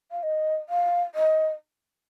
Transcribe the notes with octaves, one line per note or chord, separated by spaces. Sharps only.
F5
D#5
F5
D#5